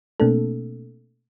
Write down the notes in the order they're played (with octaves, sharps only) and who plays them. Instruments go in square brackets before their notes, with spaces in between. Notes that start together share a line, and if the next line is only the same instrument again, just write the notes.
[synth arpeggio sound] B2 A3 A#3 C4 D4 A4